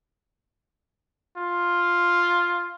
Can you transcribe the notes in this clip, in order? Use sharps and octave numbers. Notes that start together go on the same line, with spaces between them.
F4